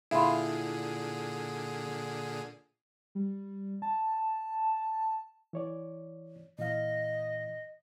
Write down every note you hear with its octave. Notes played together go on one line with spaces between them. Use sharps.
A#2 D3 E4 F4 G#4
G3
A5
E3 C#5 D5
A#2 E3 D#5 F5